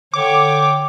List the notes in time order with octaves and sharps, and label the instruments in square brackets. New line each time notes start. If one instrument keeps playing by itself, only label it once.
[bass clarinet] D3 [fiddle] C#5 G5 [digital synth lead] D6